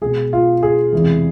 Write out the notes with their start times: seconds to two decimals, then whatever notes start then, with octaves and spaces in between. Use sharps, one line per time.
0.01 B2 G#3 G#4
0.33 F4
0.63 G#4
0.93 E2 C3 E3 G#3